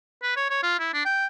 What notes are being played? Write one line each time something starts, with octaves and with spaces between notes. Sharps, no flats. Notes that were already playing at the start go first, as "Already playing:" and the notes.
B4
C#5
C#5
F4
E4
D4
G5